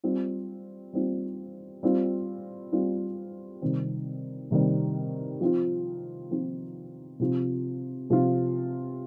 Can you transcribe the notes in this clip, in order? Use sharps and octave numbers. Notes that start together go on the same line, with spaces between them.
G3 C4 F4
G3 C4 F4
G3 C4 F4
G3 C4 F4
C3 D#3 G3 C4
C3 D#3 G3 C4
F3 C4 F4
F3 C4 F4
C3 F3 C4 F4
C3 F3 C4 F4